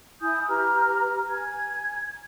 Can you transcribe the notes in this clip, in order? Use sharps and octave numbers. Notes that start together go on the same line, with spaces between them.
E4 G#5 D#6 G6
G4 B4 A#5 F6
G#5 G#6